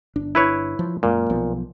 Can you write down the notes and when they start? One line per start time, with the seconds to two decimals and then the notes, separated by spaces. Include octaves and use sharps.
0.16 G1 D4
0.35 E4 B4 C#5
0.79 F3
1.03 F#2 A#2 G#3 A#3
1.30 B1 F3 B3